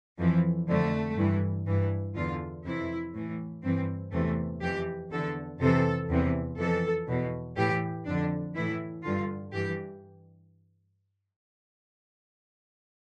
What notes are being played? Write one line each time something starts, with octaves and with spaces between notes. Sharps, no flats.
F2 E3 F3
F2 D3 A3
G2 E3
G2 E3
E2 D3 F4
F2 C3 E3 E4
A2 E3
G2 E3 C4
E2 C3 E3 A3
F2 E3 G4
E2 D3 A4
F2 C3 E3 A4
E2 C3 E3
F2 E3 A4
E2 B2
A2 E3 G4
F2 D3 D4
A2 E3 E4
G2 D3 F4
G2 E3 G4